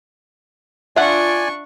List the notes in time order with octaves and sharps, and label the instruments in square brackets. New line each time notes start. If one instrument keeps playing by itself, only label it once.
[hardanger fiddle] D4 C#6 [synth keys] F4 [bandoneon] D5 G#5 [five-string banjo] E5 F#5